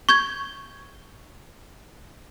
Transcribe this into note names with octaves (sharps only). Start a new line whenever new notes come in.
C#6 G6 G#6